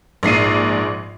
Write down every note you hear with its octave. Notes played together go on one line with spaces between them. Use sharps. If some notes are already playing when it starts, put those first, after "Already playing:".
A#1 G#2 C7 D#7